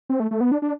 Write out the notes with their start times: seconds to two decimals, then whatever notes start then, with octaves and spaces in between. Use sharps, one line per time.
0.09 C4
0.20 A3
0.31 A3
0.41 B3
0.52 D4
0.62 D4